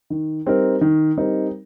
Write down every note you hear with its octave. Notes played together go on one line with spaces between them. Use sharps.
D#3
G3 C4 D#4 A#4
D#3
G3 C4 D#4 A#4